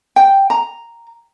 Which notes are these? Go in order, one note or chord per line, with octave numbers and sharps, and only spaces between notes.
G5
A#5